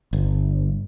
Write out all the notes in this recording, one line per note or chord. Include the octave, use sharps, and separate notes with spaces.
G1